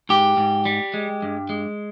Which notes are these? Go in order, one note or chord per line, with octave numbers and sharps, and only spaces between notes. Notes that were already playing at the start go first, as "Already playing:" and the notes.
G#2 G4
G#2
G3
G#3
G2
G#3